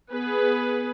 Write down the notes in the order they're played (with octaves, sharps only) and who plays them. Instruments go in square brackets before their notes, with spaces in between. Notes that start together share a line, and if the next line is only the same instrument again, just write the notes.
[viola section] B3 G#4 B4